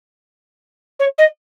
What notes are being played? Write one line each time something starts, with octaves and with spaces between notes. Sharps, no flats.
C#5
D#5